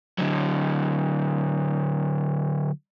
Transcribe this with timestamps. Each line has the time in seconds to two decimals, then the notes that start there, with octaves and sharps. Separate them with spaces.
0.18 D3 F#3